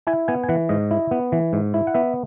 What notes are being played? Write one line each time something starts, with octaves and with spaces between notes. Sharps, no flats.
E4 G#5
B3 G#5
G#5
E3 F#5
G#2 D#5
E4
B3
E3
G#2
E4
F#5
B3 E5